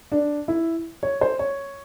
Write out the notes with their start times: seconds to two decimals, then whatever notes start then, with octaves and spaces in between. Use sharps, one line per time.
0.12 D4
0.48 E4
1.03 C#5
1.21 C5
1.39 C#5